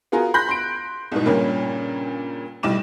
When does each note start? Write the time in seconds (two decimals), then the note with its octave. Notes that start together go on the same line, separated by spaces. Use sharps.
0.12 B3 F4 F#4 G#4 A#4
0.34 B5 C6 F#6 G6 A#6
0.49 C6 D7
1.12 C2 G#2 B2
1.25 G2 A#2 C#3 G3 A#3 C#4
2.63 B1 A2 G3 D6 E7